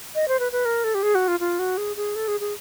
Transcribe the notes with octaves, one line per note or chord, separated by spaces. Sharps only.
D#5
C5
B4
B4
A#4
A4
G4
G#4
F#4
F4
F4
F#4
G#4
G#4
A4
G#4
G#4